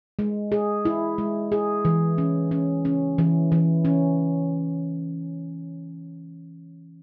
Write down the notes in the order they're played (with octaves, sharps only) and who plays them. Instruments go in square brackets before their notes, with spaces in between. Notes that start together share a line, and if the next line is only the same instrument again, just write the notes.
[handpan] G#3
G#4
E4
G#3
G#4
E3
C#4
C#4
C#4
E3
E3
C#4